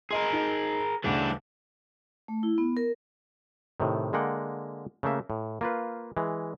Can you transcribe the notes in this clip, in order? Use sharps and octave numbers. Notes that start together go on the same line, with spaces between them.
G#4 A#4 D#5 C6
D#4
D2 C#3 E3 G3 D4
A3
E4
B3
A#4
A2 C3 D#3
D3 G#3 A#3 F#5 G5
C#3 A3 A#3 E5
A2
A#3 F4 B4
E3 G#3